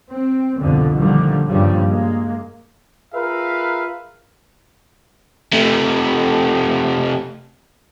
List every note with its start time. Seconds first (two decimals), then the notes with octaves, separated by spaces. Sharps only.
0.11 C4
0.61 C2 F2 B2 D3
0.97 A#2 D3 D#3 F3 G3
1.48 G2 A#2 C#3 F3 G3
1.87 G#3 A#3
3.14 F4 G#4 A#4 B4 E5 F5
5.53 C3 A3